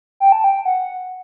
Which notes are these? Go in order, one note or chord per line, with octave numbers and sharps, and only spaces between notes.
G5
A5
G5
F#5